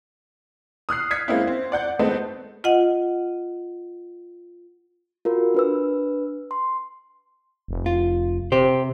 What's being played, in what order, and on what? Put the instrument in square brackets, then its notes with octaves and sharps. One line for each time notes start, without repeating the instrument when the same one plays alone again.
[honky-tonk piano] D#6 F6 F#6 C7
D#6 F6 G#6 B6 C#7
G#3 A#3 C4 C#4 E4
C4
D5 F#5 G6
G#3 A3 B3 C4 D#4
[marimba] F4 D#5 F#5
[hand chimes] F4 F#4 A#4
D4 B4 E6
C6
[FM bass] F1
[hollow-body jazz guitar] F4
[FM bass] C3 [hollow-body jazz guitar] G4 C5